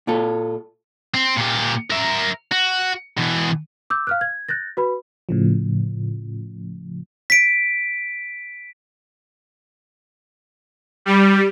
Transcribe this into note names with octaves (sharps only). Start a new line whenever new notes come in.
A#2 F4 A4
C4
A#2 G4
A#4 E5
F#4
B2 E3
D6 E6 G6
F5 F6 F#6
G#6
F#6 G6 A6 A#6
F#4 B4 B5
A2 C#3 F3
B6 D7
G3